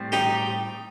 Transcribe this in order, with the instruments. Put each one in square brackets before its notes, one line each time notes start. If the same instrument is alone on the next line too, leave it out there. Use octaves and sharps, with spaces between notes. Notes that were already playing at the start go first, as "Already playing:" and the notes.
Already playing: [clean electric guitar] A2 G3 C4
[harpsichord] D#4 G4